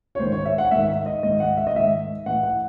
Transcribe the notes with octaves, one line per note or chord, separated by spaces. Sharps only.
C#5
G#2 D#3 C5
C#5
E5
F#5
G#2 D#3 E5
E5
D#5
G#2 D#3 D#5
F#5
E5
D#5
G#2 D#3 E5
A2 E3 F#5
F#5